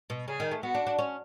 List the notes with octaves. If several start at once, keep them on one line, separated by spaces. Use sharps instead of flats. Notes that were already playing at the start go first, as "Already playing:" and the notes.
B2
C#3 G#4
D#3
A3
B3 F#4
D4
D4
C#4